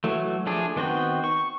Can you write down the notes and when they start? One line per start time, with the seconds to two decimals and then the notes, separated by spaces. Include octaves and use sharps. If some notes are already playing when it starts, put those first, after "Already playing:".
0.04 E3 F#3 A3
0.46 F3 A3 D4 G#4
0.76 D#3 B3 C4 F#4 G5
1.24 C#6